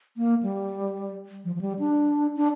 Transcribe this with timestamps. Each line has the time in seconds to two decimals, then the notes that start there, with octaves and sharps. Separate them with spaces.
0.17 A#3
0.43 G3
1.45 F3
1.55 F3
1.61 G3
1.79 D4
2.36 D4